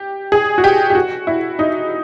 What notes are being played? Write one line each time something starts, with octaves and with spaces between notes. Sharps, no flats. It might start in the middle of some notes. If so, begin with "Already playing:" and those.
Already playing: G4
G#4
F#4
G4
G4
F#4
E4
D#4